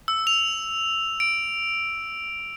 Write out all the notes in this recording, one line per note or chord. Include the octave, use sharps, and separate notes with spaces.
E6
F7
D7